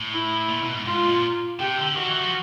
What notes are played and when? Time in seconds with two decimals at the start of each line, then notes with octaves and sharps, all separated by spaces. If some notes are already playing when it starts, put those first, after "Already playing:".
Already playing: A2
0.12 E4
0.49 A#2
0.61 B2
0.74 G#2
0.85 G#2 F4
1.05 A#2
1.59 C3 G4
1.77 D3
1.96 D#3 F#4
2.08 E3
2.21 F3